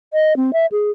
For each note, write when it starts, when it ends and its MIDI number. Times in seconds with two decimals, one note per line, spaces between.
0.13 0.36 75
0.36 0.51 60
0.53 0.66 76
0.72 0.91 68